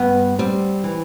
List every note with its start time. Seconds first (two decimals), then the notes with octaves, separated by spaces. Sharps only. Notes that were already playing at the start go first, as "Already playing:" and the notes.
Already playing: G2 B3
0.39 G3 C4
0.84 E3